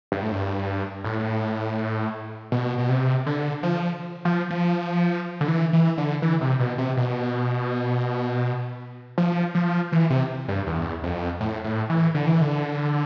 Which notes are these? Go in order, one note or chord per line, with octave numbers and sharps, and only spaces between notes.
G2
A2
G2
A2
B2
B2
C3
D3
F3
F3
F3
D3
E3
E3
D3
E3
C3
B2
C3
B2
F3
F3
E3
C3
G2
E2
F2
A2
A2
E3
D3
E3
D3